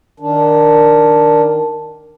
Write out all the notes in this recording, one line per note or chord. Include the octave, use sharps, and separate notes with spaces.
D#3 D4